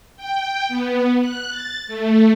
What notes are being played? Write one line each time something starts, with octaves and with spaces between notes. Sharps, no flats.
G5
B3
F#6
A6
A3